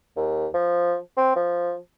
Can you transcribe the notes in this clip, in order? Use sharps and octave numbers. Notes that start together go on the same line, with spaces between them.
D#2
F3
C4
F3